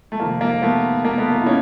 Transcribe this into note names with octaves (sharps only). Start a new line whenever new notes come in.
A3
F2 C3 D#3 A#3
A#3
A3 B3
A#3
A3 B3
A#3
E4
C#4 D#4